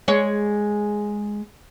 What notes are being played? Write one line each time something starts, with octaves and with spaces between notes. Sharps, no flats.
G#3 C#5